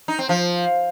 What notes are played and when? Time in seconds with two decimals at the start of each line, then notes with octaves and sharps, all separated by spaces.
0.08 D#4
0.19 C4
0.29 F3